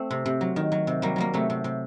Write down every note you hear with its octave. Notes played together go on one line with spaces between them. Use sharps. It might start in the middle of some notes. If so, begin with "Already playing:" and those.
Already playing: A3 C4
C3
C3
F#3
D#3
F#3
C3
F#3 G3 A#3
F#3 G3 A#3
C3 F#3 A3
C3
C3